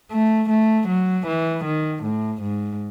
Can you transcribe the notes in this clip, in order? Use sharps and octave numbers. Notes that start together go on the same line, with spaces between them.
A3
A3
F#3
E3
D#3
A2
G#2